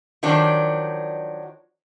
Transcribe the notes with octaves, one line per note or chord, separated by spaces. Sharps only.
D#3 F3 F#3 D4